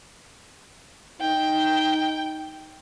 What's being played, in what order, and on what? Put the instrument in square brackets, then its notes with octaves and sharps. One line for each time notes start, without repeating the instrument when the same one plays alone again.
[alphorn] D#4 [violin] G5